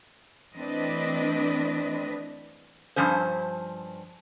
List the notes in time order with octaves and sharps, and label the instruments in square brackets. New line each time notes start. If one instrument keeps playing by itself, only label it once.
[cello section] E3 A3 C4 D4 B4 D#5
[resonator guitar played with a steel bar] G2 F3 C#4 C5